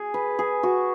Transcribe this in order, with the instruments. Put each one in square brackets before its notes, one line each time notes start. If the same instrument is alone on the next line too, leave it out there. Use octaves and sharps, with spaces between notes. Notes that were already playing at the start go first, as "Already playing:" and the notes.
Already playing: [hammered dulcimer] G#4
B4
G#4
F#4